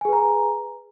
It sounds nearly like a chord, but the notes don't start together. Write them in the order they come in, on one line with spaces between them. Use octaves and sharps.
G#5 G#4 B4 A#5